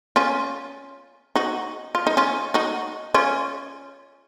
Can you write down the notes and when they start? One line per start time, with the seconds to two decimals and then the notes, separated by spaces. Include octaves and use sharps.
0.16 C#4 F4
1.35 D#4 F#4
1.95 F4
2.07 D#4
2.17 C#4 F4
2.54 D#4 F#4
3.14 C#4 F4